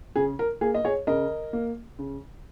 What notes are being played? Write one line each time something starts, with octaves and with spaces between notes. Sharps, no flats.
C#3 G#4
A#4
A#3 G#4
D#5
G#4 C#5
C#3 A#4 D#5
A#3
C#3